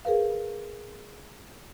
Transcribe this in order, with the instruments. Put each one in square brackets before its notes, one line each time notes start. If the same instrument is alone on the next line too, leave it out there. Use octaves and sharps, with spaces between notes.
[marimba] G#4 A#4 B4 F5